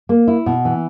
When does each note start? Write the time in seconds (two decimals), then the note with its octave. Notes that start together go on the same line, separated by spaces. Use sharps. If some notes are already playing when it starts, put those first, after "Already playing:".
0.09 A#3
0.28 E4
0.46 B2
0.65 E3